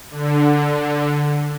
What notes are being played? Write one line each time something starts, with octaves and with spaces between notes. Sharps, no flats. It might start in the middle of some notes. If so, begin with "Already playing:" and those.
D3